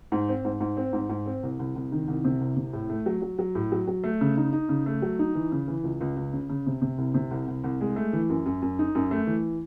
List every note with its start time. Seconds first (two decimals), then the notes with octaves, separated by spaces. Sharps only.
0.12 G#2
0.29 C4
0.45 G#2
0.60 G#2
0.77 C4
0.93 G#2
1.09 G#2
1.26 C4
1.43 C2
1.59 C2
1.76 C2
1.92 D#3
2.08 C2
2.25 C3
2.41 C2
2.56 C3
2.73 A2
2.90 A3
3.06 F#3
3.22 F#3
3.39 F#3
3.55 A2
3.72 F#3
3.87 F#3
4.04 A3
4.21 C#3
4.37 D#4
4.53 D#4
4.69 C#3
4.86 A3
5.02 F#3
5.19 D#4
5.35 E3
5.52 C#3
5.68 E3
5.84 C#2
6.01 C#2
6.17 C#2
6.33 C#3
6.50 C#3
6.67 C3
6.82 C3
6.98 C2
7.14 C3
7.31 C2
7.48 C2
7.64 C2
7.81 G#3
7.96 A3
8.13 E3
8.30 F#2
8.46 F#2
8.62 F#2
8.79 D#4
8.95 F#2
9.11 A3
9.27 E3